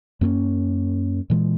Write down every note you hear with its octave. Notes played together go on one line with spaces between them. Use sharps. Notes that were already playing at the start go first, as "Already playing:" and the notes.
F#2 A#3 C4 C#4
A#2 E3 G#3